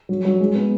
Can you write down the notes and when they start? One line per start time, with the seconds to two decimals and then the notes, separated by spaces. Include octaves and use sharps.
0.09 F#3
0.25 F#3
0.40 G#3
0.55 B3